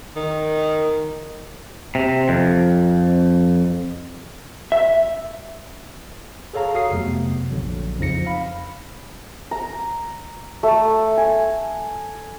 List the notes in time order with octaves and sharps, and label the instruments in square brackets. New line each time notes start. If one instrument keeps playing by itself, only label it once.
[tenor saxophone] D#3
[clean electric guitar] C3
F2
[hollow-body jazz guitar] E5
[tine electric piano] G#4 A4 C#5 F5 A#5
F#4 F5 D#6 C7
F2 C3 F#3 A3 B3
A#1 D3 F#3
F2 C#3 F3 D#4 A#6 C#7
F5 B5
[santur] A#5
A3
G#5